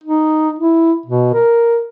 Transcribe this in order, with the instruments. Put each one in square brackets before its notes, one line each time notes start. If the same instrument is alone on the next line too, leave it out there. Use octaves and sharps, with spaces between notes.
[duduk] D#4
E4
B2
A#4